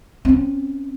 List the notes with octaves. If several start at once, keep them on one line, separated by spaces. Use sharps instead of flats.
C4 C#4